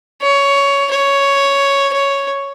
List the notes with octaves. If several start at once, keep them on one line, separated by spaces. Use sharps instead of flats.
C#5
C#5
C#5